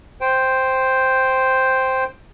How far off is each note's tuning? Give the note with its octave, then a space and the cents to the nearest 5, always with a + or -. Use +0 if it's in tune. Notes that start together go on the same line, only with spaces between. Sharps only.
C5 +0 G5 +0